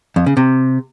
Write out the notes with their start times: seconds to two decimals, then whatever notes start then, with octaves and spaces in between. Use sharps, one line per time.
0.16 F2
0.26 C#3
0.37 C3